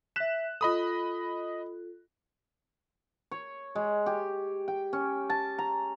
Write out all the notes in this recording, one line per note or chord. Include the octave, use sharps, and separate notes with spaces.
E5 F#6 B6 E7
F4 A4 D#5 B5 D#6
C#5
G#3
G4
G5
C#4
A5
A#5